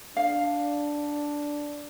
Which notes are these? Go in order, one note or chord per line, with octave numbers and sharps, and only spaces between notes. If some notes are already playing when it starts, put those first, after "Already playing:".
D4 F5